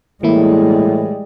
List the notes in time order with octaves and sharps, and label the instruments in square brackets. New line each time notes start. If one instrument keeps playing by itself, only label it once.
[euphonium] A2 [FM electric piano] E3 A#3 E4 [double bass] G3 G#3